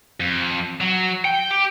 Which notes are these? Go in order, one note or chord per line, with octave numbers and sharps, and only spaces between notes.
F2
F#3
G5
G4